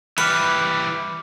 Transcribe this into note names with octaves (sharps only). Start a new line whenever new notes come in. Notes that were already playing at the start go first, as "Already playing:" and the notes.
E3 G3 B4 D6 F6 C#7